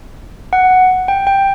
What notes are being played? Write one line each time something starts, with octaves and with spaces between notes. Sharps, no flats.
F#5
G5
G5